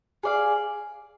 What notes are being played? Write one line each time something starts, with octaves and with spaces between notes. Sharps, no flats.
G#4 D5 F5